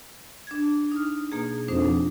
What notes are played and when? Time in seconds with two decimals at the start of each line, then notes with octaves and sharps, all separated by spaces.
0.47 D4 G#6
0.92 D#4 F6
1.32 B2 A#3 G#4
1.68 F2 D4 D#4 C5